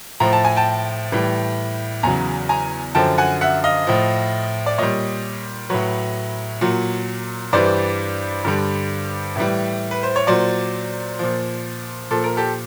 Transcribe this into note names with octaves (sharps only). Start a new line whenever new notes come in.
A2 F3 A#5
A5
G#5
G5 A5
A2 E3 G3
E2 C#3 F#3 G#5 A#5
G#5 A#5
F#2 D3 F3 G5 A5
F#5 G#5
E5 F#5
D#5 F5
A2 F3
D5
A#2 G3 C#5 D#5
A2 F#3 B4 C#5
A#2 F#3
G2 E3 G3 C5 D5
G2 D3 G3
A2 E3 G3
B4
C5
C#5
A#2 F#3 C5 D5
A#2 F3
A#2 F3 A4
A#4
G4 A4